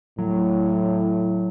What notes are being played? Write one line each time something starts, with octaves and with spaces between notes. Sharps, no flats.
A2 F#3